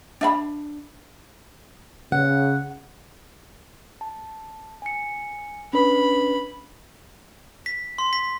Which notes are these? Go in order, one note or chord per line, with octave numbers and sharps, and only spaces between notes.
D4 E5 B5
C#3 F#5
A5
G#5 C#7
C#4 D4 B4 B5
B6
C6
B6